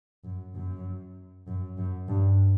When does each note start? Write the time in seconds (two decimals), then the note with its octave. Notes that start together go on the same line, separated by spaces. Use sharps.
0.25 F#2
0.55 F#2
1.48 F#2
1.77 F#2
2.08 G2